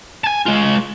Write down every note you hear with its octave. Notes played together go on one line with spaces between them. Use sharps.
G#5 A5
G#3 F4